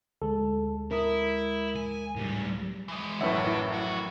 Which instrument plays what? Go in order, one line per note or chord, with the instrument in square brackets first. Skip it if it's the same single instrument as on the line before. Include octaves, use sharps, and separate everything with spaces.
[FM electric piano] D2 G#3 [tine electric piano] A4
[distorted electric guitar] E4 [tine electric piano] A#4 D#6
[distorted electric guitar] G#5
A2 G3
[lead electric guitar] E3 G#3
[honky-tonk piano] A1 F#2 A2 [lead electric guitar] D4 F#5 [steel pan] B4 C#5 E5
[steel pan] E4
[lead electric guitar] F2 F#4